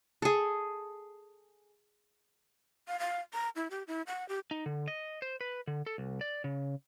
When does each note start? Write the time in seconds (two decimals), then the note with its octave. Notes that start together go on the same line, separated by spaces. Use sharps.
0.22 G#4 A4
2.88 F5
3.00 F5
3.34 A#5
3.56 E4
3.71 G4
3.88 E4
4.07 F#5
4.29 G4
4.51 D#4
4.66 D3
4.88 D#5
5.22 C5
5.41 B4
5.67 D3
5.86 A4
5.98 C2
6.21 D5
6.44 C#3